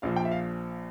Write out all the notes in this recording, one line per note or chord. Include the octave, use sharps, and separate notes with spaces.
A#1 A#2 F3 F5
G5
E5
F5